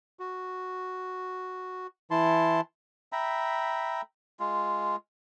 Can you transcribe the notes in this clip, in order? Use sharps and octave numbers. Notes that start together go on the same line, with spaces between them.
F#4
E3 E4 A5 C6
E5 G5 A#5 B5
G#3 F4